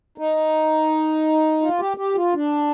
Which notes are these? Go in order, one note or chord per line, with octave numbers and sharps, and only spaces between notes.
D#4
F4
G4
G4
F4
D4